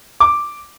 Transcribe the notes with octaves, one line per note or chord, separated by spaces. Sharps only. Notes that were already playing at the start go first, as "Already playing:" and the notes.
D6